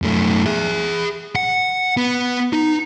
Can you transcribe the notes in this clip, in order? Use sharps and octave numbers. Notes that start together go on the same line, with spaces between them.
F#2 A3
G#4 E5
F#5
B3
D#4